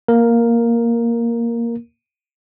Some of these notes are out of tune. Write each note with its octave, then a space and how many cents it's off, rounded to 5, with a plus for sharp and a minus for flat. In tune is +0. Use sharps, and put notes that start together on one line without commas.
A#3 +0 A#4 +0